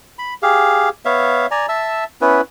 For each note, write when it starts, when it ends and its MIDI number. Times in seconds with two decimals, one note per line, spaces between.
0.19 0.34 83
0.43 0.89 67
0.43 0.89 68
0.43 0.89 77
1.05 1.47 59
1.05 1.47 73
1.05 1.47 76
1.05 1.47 77
1.51 1.66 74
1.51 1.66 80
1.51 1.66 82
1.69 2.04 76
1.69 2.04 81
1.69 2.04 88
2.21 2.41 59
2.21 2.41 61
2.21 2.41 64
2.21 2.41 71